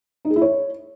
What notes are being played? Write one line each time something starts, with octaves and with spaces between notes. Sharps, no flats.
D#4
G#4
E4
C#5